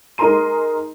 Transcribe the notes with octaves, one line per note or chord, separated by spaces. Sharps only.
G#3 D#4 A#4 A#5 C6 D#7